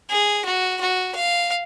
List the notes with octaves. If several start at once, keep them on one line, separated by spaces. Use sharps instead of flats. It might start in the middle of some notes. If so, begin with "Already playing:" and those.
G#4
F#4
F#4
F5